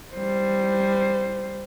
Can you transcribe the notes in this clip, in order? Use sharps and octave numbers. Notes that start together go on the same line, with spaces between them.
G3 C5